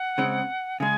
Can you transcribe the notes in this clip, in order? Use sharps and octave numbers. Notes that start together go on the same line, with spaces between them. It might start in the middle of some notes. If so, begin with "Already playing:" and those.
Already playing: F#5
C#3 G#3 C4
C#3 G#3 G#5